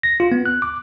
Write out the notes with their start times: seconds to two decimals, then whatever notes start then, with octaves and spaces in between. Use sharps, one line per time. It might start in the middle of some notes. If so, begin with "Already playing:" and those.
0.03 A#6
0.20 F4
0.32 B3
0.46 F#6
0.62 D6